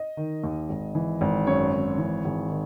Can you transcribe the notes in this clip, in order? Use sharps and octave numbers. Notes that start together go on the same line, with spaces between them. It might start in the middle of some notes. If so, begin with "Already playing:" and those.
Already playing: D#5
D#3
D#2
G#1
E3
G#1
F#2 C#5
G#1
E3
G#1
D#3